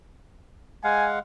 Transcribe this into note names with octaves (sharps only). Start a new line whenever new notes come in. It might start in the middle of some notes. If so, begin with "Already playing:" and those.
G#3 F5 F#5 G#5